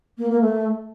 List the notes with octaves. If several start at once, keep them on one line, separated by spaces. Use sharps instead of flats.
A#3
A#3
A3